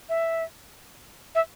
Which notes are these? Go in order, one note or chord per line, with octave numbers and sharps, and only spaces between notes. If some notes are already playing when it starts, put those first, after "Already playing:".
E5
E5